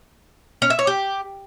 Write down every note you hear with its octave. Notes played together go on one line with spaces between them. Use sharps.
C#4
E5
C#5
G4